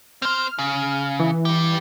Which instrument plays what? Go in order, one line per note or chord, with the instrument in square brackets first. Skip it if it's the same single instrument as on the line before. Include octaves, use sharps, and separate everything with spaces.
[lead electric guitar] C4 C5 [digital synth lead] F6
[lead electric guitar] C#3
[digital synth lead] E3
[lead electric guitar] G2 G4